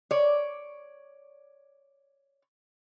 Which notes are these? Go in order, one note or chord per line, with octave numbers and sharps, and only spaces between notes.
C#5 D5